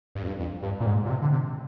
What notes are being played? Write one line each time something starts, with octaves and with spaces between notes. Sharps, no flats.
G2
F2
G2
F2
G2
A#2
G#2
A#2
C3
D3
C3